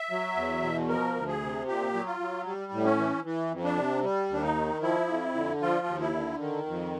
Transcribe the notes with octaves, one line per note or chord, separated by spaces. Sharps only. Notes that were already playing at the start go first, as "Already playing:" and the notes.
Already playing: E5
F#3
E2
B2
F3 A#4
D2
G#4
C3
A#2 G4
F#3
F4
F#3
G3
A2
C#4
E3
E3
F2
D4
C3
G3
D#2 D4
D#4
D#3
F3 E4
F2
D3
F3 F4
D#2
E4
D3
D#3
F2